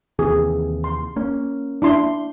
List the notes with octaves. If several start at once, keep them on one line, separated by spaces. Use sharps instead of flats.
D#2 C3 E3 G#4
C6
A#3 C#4
D4 E4 C6